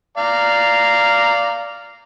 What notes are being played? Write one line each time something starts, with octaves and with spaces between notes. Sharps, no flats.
D5 F5 A#5